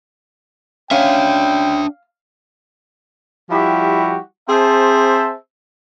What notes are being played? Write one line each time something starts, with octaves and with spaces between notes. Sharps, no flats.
C#4 D4 E5 F5 G5
F3 G3 E4 F#4 G4
C4 G#4 C5 E5 A5